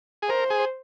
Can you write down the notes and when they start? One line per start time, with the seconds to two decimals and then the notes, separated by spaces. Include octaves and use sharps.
0.22 G#4
0.29 A#4 C5
0.50 G#4